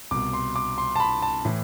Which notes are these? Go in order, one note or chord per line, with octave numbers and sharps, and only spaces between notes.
C2 B2 D6
C6
D6
C6
A5
B5
A5
A2 E3